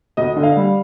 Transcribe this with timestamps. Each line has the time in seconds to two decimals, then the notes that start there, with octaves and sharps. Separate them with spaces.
0.17 D2 D#5
0.36 D3
0.43 F5
0.56 G3